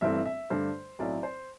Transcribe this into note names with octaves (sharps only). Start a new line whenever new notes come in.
G1 G2 E3 A3 C4 E5
E5
G2 D3 A3 D4 C5
B1 A2 F#3 C4 E4 D5
C5